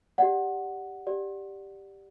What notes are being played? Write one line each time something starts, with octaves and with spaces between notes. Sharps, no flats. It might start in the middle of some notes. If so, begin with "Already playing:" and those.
G4 D5 F#5
G4 D5